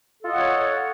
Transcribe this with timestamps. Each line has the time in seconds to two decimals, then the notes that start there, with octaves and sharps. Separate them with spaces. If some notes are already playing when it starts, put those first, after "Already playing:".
0.19 A4
0.24 F4
0.28 D#5
0.32 F#5
0.36 C#5